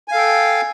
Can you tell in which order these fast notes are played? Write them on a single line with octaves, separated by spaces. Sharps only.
G#5 F5 A4 G5